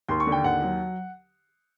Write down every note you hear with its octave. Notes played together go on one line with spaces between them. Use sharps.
D#2 C6
C#6
D3
G5
D#2 F#5
F#3